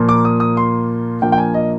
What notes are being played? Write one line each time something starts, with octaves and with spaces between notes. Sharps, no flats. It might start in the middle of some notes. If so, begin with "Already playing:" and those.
Already playing: A#2 F3 A#3
D6
D#6
D#6
C6
A#2 F3 A#3 D4 G5
G5
G#5
D#5